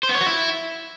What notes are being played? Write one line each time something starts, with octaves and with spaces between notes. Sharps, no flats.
C5
B3
C#5
F#4
E4